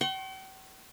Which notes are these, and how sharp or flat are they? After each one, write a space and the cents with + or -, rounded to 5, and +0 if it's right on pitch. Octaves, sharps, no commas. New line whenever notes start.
G5 -45 C#6 -45